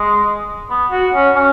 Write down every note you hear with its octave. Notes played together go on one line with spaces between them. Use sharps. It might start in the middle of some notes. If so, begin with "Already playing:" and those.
Already playing: G#3
B3
F#4
C#4
C#4